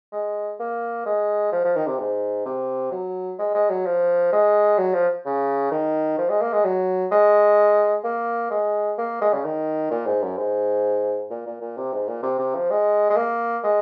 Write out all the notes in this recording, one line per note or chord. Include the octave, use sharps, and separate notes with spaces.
G#3
A#3
G#3
F3
F3
D#3
C3
G#2
C3
F#3
G#3
G#3
F#3
F3
G#3
F#3
F3
C#3
D#3
F3
G#3
A#3
G#3
F#3
G#3
A#3
G#3
A#3
G#3
C#3
D#3
A#2
G#2
F#2
G#2
A#2
A#2
A#2
C3
G#2
A#2
C3
C3
F3
G#3
G#3
A#3
G#3